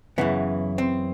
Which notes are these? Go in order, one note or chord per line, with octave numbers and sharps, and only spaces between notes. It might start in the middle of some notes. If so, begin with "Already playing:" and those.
F#2 C#3 E3 B3
C4